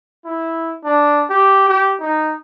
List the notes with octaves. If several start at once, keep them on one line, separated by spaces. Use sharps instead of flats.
E4
D4
G4
G4
D#4